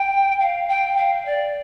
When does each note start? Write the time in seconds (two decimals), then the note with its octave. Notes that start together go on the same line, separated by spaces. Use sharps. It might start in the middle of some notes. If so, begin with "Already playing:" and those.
Already playing: G5
0.40 F5
0.69 G5
0.97 F5
1.26 D5